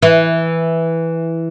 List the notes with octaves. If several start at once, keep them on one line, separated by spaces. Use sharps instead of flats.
E3